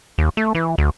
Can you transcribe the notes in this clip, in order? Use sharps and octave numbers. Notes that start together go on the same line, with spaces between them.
D#2
A3
E3
D2